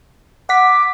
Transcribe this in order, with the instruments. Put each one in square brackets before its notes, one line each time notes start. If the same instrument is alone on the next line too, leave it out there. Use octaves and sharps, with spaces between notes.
[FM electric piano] F#5 B6 [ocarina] D6